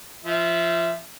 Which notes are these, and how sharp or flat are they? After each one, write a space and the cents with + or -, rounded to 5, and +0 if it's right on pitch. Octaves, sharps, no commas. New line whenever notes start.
F3 -20 E5 +0